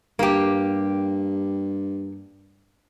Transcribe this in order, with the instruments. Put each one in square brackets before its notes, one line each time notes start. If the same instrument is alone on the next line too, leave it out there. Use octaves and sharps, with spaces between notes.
[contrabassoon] G2 [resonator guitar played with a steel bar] A#3 G4